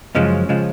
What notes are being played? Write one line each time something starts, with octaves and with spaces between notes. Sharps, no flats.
F#2 C#3 F3 G#3 C#4
C#3 F3 G#3